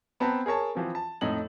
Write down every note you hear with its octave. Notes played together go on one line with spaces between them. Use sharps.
B3 C4 B4 A5 A#5
G#4 A#4 C#5 A5
E3 F3 C4
A5
F2 A2 D#4 F#7